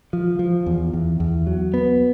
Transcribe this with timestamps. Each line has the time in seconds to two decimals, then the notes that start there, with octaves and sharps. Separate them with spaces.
0.13 F3
0.39 F3
0.66 E2
0.93 E2
1.20 E2
1.47 F#3
1.74 B3